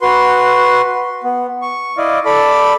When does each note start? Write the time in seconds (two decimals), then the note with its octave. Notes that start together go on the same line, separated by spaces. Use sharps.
0.01 F#4 B4 C6
1.24 B3
1.62 C#6
1.97 E4 D5 D#5 F5
2.25 A4 D5 B5